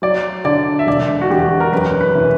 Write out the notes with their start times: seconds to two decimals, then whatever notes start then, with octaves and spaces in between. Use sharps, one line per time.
0.02 F#3 D5
0.44 D3 D5
0.79 E5
0.87 E1 D5
1.21 F#4
1.31 E2 G4
1.60 A#4
1.73 F#2 B4
2.01 B4
2.15 E3